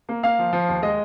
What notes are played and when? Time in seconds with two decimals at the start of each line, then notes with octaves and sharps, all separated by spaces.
0.09 A#3
0.23 A#3 F5
0.39 F3
0.53 F3
0.68 D#2
0.82 G#3 D#5